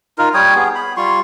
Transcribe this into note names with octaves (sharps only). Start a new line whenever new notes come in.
D#4 F4 A#4
G3 C#5 G5 D#6
B3 G#4
B5
G3 F4 C6 C#6